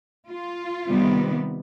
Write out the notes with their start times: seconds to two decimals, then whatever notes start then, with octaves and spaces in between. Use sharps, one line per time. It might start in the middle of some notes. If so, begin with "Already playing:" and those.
0.31 F4
0.89 C3 D#3 G3 B3